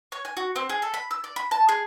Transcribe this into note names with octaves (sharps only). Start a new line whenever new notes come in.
C#5
G#5
F#4
C4
G#4
A4
B5
E6
D5
B5
A5
G#4